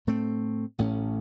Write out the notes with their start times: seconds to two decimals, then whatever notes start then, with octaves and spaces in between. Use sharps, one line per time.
0.07 A2 A3 C4
0.78 A1 A2 A3 C#4